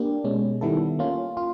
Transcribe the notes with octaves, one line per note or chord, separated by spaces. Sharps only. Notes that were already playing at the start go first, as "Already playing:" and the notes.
Already playing: A#3 D4 G4
B2 G#3 C#4
D#3 G3 B3 E4 A4
A#3 C#4 F4
F4